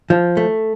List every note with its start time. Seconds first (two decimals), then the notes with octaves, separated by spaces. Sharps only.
0.10 F3
0.37 A3